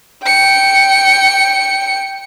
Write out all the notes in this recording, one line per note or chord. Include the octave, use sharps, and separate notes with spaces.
G5 C#7